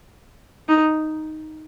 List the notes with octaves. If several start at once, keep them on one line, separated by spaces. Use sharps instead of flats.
D#4